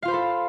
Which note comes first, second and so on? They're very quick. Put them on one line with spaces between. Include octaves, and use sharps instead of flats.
F5 F4 C5 B5 A4